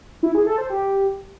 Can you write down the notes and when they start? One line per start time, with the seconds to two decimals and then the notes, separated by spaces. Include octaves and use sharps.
0.23 E4
0.35 G#4
0.46 A4
0.58 C5
0.70 G4